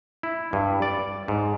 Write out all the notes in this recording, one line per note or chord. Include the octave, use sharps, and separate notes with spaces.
E4
G2
D5
G#2